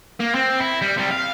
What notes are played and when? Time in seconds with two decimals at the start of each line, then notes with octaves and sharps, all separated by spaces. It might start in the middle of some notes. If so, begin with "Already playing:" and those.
0.20 A#3
0.35 C4
0.60 E4
0.82 G3
0.97 C3 G3
1.11 F5